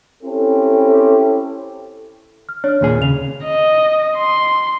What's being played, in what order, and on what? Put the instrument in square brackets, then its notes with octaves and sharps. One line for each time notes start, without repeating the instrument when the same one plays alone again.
[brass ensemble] C4 C#4 E4 G4 A4
[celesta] F6
[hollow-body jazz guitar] D4 [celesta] C#5 F6
[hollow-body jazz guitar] D#2 A#2 G#4
[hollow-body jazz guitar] C#3 [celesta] F7
[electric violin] D#5
C6